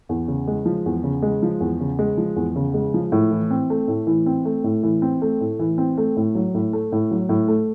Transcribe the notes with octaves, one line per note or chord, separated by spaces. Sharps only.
E2
C#3
G#3
F3
E2
C#3
G#3
F3
E2
C#3
G#3
F3
E2
C#3
G#3
F3
A2
E3
C4
A3
A2
E3
C4
A3
A2
E3
C4
A3
A2
E3
C4
A3
A2
F#3
A2
A3
A2
F#3
A2
A3